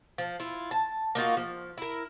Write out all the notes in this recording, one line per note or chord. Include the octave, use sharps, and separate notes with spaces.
F3
E4 F4
A5
A#3 D#4 F4 F#4
F3
E4 A#4